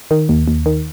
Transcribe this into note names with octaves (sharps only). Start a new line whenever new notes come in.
D#3
D#2
D#2
D#3